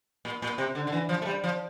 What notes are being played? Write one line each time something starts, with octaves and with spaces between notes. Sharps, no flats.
A#2
A#2
C3
D3
D3
E3
F3
A3
G3
F3